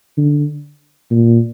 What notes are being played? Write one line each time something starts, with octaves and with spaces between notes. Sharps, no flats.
D3
A#2